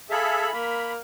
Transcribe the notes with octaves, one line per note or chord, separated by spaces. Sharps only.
G#4 A4 E5 F5 B5
A#3 B5